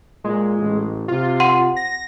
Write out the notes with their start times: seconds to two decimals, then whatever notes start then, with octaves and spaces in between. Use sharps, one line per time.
0.24 A#2 G#3
0.58 A1
1.08 C3 F4
1.40 F#5 C6 D#7
1.76 A#6